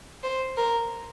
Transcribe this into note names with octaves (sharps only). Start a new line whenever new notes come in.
C5
A#4